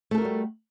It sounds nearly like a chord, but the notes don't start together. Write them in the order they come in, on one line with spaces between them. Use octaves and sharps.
A3 A4 A#4 F#4 G3